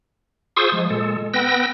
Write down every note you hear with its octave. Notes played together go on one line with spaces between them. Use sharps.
F4 G#4 C5 C#6 D#6 E6
F3 G#3
A#2 G#3 A4
B3 B4 G5 E6 A#6